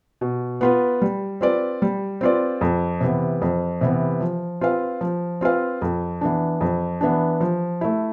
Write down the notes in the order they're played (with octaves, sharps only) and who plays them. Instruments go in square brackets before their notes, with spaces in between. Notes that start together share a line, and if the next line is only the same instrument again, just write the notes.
[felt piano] B2
B3 F4 B4
G3
C4 F4 B4 D5
G3
C4 F4 B4 D5
F2
C3 E3 B3
F2
C3 E3 B3
F3
C4 F4 B4 F5
F3
C4 F4 B4 F5
F2
E3 B3 D4
F2
E3 B3 D4
F3
A3 E4